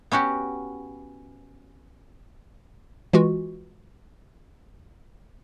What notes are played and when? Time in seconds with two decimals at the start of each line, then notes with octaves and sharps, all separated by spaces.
0.12 B3 C#4 F#4 G4
3.13 E3 G#3 F4 F#4